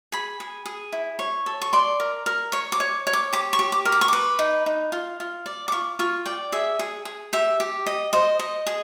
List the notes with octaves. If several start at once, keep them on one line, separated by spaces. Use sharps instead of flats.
G#4 B5
G#4
G#4
E4
C#5
A4
C#6
D5 C6
A#4
A#4
C#5 C#6
D6
C#5
C#5
D6
G4 D6
C#6
G4
D6
A#4
D6
C#6
B4 D6
D#4
D#4
F4
F4
D5
D6
F4 C#6
F4 C#6
D5 G5
G#4 E5
G#4
G#4
G4 E5
G4
D#5
C5 D#5
D#5
G#4